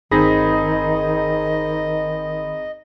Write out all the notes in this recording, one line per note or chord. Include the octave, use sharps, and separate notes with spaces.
G1 D#3 C4 D#4 G#4 D#5 B5 A#6